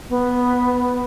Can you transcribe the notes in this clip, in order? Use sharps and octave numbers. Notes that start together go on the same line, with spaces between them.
B3